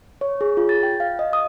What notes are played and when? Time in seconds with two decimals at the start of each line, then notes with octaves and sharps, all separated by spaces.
0.21 C#5
0.41 G#4
0.57 F4
0.69 A6
0.83 G5
1.00 F5
1.19 D#5
1.33 D#6